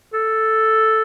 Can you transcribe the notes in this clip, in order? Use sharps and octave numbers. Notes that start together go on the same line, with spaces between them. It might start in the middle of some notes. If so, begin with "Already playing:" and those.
A4